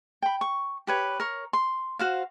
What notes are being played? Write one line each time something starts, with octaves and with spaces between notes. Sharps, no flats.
G5 B5
C#6
G4 B4 C#5
A#4 C#5
C6
F#4 C5 F5